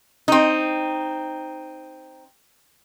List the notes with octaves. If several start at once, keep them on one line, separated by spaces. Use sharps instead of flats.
C4 D#4